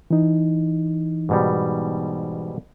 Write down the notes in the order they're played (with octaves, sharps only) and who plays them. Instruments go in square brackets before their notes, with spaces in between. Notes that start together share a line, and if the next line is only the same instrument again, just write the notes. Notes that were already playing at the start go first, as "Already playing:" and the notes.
[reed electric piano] E3 D#4
[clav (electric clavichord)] G#2 B2 G3